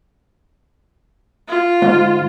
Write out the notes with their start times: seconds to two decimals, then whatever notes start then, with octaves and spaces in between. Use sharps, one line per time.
1.48 F4
1.82 D2 G#2